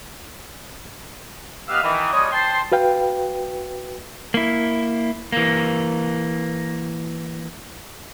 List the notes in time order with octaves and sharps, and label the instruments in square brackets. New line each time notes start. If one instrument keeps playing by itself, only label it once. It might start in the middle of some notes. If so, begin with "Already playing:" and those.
[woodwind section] B3 G4 D#5 F5 E6 F6
D#3 E3
F3 G3 B3 C#5 D#5
C5 G5 A5 C6
[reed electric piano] F#4 B4 F5 G5
[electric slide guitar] A#3 E4
[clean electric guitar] E3 A#3